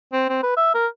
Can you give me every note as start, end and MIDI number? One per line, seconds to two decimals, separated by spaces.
0.13 0.27 60
0.29 0.40 60
0.43 0.54 71
0.57 0.73 76
0.74 0.87 70